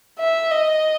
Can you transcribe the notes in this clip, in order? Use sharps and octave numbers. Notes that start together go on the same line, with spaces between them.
E5
D#5